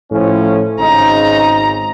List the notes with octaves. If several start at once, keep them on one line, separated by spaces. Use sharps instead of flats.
A2 F3 C#4
G#1 C#3 C4 D#4 A#5